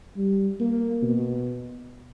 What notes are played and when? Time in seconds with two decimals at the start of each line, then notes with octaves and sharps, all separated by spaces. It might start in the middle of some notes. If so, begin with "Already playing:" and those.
0.17 G3
0.60 A#3
1.02 B2